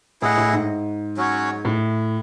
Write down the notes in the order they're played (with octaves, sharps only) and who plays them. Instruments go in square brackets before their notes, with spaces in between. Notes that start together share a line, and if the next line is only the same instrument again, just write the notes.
[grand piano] A2 [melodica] E4 G#4 D#5 F#5
[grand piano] A2
G#2
[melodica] F#3 C#4 F#4 C#5
[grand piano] A2